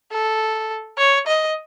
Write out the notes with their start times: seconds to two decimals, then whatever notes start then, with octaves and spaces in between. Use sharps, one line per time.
0.12 A4
0.98 C#5
1.27 D#5